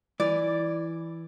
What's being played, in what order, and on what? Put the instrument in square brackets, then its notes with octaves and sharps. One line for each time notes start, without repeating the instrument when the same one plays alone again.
[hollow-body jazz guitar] E3 [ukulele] D5